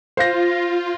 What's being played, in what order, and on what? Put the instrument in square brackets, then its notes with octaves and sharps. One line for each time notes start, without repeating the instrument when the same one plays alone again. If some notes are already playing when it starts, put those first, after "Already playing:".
[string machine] F4 [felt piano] C5 F5 A#6